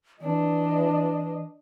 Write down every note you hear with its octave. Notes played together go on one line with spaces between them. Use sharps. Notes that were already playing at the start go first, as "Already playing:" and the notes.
E3 D4 D#5